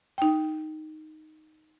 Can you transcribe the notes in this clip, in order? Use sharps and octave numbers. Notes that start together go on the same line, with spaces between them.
D#4 G5